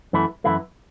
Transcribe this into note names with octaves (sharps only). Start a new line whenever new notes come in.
F#2 E3 A3 E4
F#2 E3 A3 E4